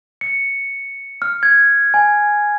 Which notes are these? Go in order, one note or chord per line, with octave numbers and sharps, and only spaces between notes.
C#7
F6
G#6
G#5